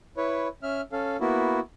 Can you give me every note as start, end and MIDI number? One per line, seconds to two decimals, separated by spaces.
0.17 0.48 64
0.17 0.48 71
0.17 0.48 73
0.63 0.81 61
0.63 0.81 76
0.63 0.81 89
0.92 1.17 61
0.92 1.17 69
0.92 1.17 77
1.20 1.60 58
1.20 1.60 59
1.20 1.60 64
1.20 1.60 66